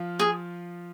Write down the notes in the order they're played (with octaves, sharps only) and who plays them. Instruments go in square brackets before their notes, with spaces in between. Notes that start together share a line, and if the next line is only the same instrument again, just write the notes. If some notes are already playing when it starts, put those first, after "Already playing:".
Already playing: [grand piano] F3 F4
[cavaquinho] G#4